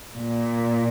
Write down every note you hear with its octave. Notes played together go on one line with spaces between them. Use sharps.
A#2